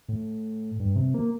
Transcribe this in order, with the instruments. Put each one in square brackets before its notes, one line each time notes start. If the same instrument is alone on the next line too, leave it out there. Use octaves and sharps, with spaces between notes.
[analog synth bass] A2
G2
C3
A#3